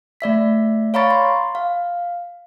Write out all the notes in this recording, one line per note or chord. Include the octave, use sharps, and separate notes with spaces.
A3 D5 E5 B6
C#5 F5 A#5 B5 C#6 A6
C6
F5